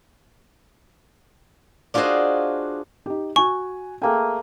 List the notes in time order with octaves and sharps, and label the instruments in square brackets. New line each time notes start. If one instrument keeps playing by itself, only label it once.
[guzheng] D4 F4 F#4 G#4 C5 D#5
[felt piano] D#4 G4
[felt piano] F#4 G#5 [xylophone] C#6
[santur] A3 A#3 G#5 [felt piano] G#4 A4 G5